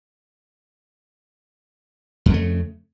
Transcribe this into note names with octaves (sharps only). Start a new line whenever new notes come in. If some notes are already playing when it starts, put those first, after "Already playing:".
F2 C#3 A3